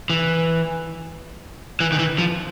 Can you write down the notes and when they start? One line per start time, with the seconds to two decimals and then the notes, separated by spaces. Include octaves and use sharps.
0.10 E3
1.80 E3
1.92 D#3
1.99 E3
2.18 F3